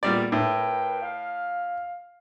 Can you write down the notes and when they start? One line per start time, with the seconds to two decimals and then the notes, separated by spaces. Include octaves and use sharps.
0.03 E2 A#2 G3 B3 D5
0.32 A2 A#4 B4 G5
1.02 F5